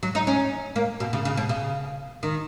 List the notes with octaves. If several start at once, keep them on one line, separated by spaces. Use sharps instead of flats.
F#3
D#4
C#4
A#3
B2
C#3
C#3
B2
C#3
D#3